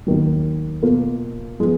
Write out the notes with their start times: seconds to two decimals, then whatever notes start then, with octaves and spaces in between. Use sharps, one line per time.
0.07 D#2 D#3 F#3
0.83 B2 A#3 F4
1.60 F3 G#3 B3